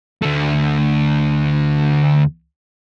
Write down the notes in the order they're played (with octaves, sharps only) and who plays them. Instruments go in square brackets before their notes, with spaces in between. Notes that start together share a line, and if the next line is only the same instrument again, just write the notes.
[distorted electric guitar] D2 A3